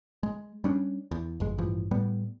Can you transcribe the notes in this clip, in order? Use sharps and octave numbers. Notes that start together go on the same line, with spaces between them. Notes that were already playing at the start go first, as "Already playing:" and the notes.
G#3
G3 C#4 D4
E2
G1 F2 G#3
A1 G2 E3 F3
A2 G3 B3